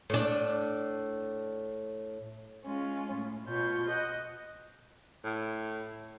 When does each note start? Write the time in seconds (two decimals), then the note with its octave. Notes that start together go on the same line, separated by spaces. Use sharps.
0.10 A2 D4
2.65 G#3 C#4 F4
3.13 A2
3.48 B2 F4 C#5 G6
3.89 D#5 F#5
5.24 A2